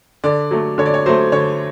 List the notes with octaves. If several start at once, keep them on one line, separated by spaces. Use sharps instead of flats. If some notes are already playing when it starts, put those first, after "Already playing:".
D3 D5
F#3 A3
D3 C#5
D5
C#5
F#3 A3 C5
D3 C#5